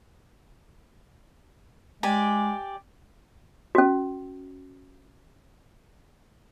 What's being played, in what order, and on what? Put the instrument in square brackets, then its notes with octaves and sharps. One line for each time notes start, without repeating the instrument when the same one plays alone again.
[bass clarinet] G#3 [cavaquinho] G4 D5 G#5
[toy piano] C#4 F#4